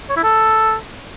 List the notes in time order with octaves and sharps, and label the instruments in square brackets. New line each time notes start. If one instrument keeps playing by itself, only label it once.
[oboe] C#5
E4
A4